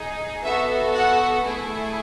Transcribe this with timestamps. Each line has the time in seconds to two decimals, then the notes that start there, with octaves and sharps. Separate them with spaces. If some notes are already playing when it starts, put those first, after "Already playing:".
Already playing: D#4 G#4
0.43 B3 F#4 A4 E5
0.94 F#5
1.44 A3 E4 G#4